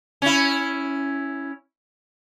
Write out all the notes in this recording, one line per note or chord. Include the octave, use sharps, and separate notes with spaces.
C#4 E4